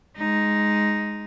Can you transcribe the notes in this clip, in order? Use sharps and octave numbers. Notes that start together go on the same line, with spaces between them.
G#3 D#4